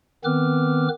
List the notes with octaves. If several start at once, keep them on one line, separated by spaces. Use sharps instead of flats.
D#3 B3 C4 B4 D6 F6